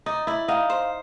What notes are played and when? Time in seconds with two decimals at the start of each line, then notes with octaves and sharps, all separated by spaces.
0.06 D#4 D5
0.27 E4 D5
0.48 D#4 F5
0.70 C5